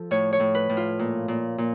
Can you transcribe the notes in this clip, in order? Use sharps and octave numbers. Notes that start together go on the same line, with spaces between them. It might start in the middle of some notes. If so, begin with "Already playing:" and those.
Already playing: F3 A4
A2 C#5
C#5
A2
B4
A2
F4
A#2
A#2
A#2